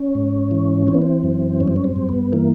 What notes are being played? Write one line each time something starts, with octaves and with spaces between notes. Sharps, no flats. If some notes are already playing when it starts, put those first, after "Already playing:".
Already playing: C#4
G#2
E3
E3 C4
B3
C4
F#2
G2 C#4
C4
C#4
C4
G2
B3
E3 A#3